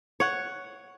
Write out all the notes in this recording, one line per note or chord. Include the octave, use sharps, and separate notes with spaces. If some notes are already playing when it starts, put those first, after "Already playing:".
C#5 F#5